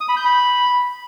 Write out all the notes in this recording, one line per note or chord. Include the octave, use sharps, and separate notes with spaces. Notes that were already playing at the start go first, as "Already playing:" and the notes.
D#6
B5
G6
B5